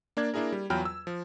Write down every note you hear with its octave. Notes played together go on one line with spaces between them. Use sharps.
A#3 D4 D5 G#6
A#3 D4 E4 G#4 A#4
G3
E2 F#3 F4 G5 B5 F6
E6
F3